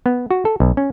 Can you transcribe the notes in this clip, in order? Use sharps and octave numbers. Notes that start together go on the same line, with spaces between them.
B3
F#4
A4
B1
C#4